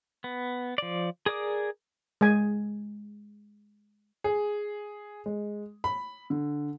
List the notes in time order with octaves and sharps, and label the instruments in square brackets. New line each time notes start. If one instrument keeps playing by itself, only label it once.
[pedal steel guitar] B3
F3 D5
G#4 A#4 D5 D6 D#6
[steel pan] G#3 G#5
[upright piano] G#4
G#3
B5
D3